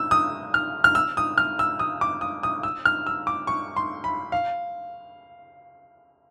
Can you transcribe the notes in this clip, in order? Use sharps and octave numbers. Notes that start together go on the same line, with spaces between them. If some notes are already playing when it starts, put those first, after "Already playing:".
Already playing: E6
D#6
F6
F6
E6
D#6
F6
E6
D#6
D6
D#6
D#6
E6
F6
E6
D6
C#6
C6
B5
F5